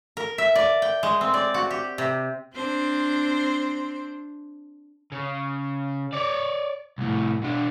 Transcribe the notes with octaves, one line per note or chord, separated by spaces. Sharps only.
A#4
E5
D5
G5
G#3
C4
D5
F#4
G4
C3
C4 D4 C5
C#3
C#5 D5
C2 A2
B2 D4